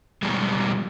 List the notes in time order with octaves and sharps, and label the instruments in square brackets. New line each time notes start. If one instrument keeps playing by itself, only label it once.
[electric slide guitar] B2 F3 G3 G#3